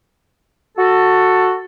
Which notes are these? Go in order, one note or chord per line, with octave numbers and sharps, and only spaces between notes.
F#4 A4